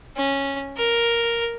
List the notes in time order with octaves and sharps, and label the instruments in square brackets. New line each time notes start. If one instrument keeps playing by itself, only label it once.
[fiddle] C#4
A#4